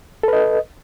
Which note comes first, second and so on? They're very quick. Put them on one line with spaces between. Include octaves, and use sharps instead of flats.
A4 B4 D#5